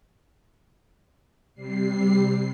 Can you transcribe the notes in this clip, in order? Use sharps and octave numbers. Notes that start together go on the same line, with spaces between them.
C3 G3 C7